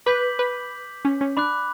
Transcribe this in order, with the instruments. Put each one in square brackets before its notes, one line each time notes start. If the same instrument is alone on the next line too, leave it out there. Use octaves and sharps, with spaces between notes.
[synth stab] B4 [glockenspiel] D6 G6 B6 F#7
[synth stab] B4
C#4
C#4
[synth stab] D4 [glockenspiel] B5 D6 F#6